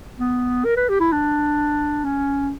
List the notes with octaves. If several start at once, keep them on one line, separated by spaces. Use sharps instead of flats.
B3
A#4
B4
G4
E4
D4
C#4